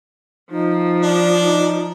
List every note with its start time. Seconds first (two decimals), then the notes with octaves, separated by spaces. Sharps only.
0.51 F3 D#4
1.03 D4
1.43 D#4